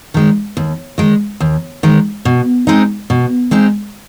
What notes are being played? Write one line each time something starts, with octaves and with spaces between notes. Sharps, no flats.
D#3 G#3
D#2
D#3 G#3
D#2
D#3 G#3
B2
G#3 C4 D#4
B2
G#3 C4 D#4